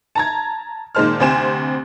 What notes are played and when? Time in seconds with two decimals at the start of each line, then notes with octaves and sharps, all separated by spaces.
0.15 A5 A#5 G#6
0.95 A#2 D#3 G#3 C5 A5 F6
1.20 D2 C3 C4 C5 G#5 E7